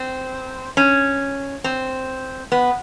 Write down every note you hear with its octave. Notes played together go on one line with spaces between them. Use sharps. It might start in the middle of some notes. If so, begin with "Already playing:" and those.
Already playing: C4
C#4
C4
B3